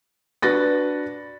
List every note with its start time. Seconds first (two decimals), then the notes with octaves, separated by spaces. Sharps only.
0.42 D4 F#4 B4 A6 A#6